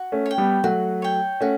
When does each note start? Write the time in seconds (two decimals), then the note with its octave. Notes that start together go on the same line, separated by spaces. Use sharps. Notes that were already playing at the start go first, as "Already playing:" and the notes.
Already playing: F#4
0.12 A3 C#4
0.26 C#5
0.31 G5
0.38 G3 B3
0.64 F#3 A3 F#4
1.02 C#5 G5
1.41 A3 C#4 F#4